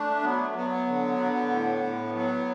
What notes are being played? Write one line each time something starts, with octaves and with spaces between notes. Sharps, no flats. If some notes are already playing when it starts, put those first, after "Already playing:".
Already playing: A3 D4
F#3 B3
A3
F#3 B3
B3
D3
D3
A2
A2
F#3 B3